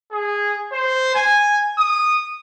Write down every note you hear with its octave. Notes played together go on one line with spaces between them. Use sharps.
G#4
C5
G#5
D#6